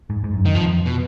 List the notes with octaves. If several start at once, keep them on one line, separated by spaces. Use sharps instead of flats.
G#2
G#2
F#2
D#3
F2 F3
B2